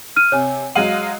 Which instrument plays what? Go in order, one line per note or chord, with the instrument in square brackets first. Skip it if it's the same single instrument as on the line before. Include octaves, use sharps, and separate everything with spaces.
[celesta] F6 D#7
[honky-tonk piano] C3 [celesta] C#5 G#5
[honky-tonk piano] F#3 G#3 F5 [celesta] D#7 F#7